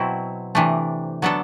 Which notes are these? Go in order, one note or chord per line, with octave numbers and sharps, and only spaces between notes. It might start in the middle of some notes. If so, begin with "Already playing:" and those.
Already playing: B2 F#3 C4 E4
C3 E3 A3 D4
D3 F#3 B3 D4 A4